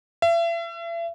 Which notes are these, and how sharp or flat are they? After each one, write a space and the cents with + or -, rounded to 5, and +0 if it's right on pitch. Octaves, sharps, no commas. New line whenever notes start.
E5 +40